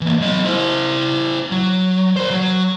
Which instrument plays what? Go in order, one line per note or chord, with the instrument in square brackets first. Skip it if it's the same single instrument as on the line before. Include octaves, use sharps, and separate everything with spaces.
[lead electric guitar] E3 A#3
F#3 D#5
E4 C5
F#3
A#4 C5
F#3